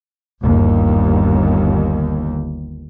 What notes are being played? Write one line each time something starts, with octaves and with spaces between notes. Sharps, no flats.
G1 D#2